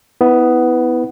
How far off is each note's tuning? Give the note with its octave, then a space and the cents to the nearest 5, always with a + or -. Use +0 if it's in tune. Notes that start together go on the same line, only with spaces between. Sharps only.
B3 +10 E4 -25